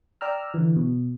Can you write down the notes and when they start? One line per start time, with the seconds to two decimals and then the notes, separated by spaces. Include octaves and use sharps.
0.21 D5 G5 A#5 E6 F6
0.54 D3 E3
0.76 B2